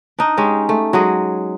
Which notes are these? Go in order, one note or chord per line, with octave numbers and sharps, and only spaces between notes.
D4 D#4
G#3 C#4 G4
A3
F#3 G#3 G#4